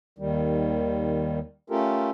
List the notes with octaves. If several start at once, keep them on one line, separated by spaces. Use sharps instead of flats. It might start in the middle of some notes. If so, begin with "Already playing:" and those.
D#2 D#3 G3
A3 C#4 F4 G4 A4 A#4